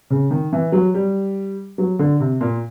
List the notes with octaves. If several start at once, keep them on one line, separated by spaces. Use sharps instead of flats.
C#3
D#3
E3
F#3
G3
F#3
D3
C3
A#2